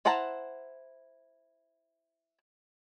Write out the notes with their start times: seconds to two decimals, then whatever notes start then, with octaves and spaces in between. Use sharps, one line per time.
0.05 E4 C5 F#5 A5 A#5